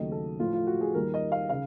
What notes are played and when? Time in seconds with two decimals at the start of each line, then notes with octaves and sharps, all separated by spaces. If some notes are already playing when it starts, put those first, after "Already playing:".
Already playing: D#2 C#3 F#3 A3 D#5
0.12 A4
0.39 A2 F3 A3 F4
0.53 F4
0.67 F#4
0.81 G#4
0.94 D#2 D#3 G3 A#4
1.14 D#5
1.32 F5
1.49 C#3 F5